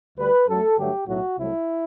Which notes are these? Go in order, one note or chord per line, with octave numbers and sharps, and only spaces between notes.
D2 D3 G3 B4
F#2 F#3 A3 A4
G2 D3 F#3 A3 G4
B1 A2 F#3 A3 F#4
C2 C3 F#3 A3 E4